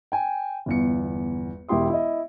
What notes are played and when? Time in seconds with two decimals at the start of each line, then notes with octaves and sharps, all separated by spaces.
0.12 G5 G#5
0.66 G1 E2 C#7
1.69 E1 E4 G4 C6 D#6
1.89 E4 D#5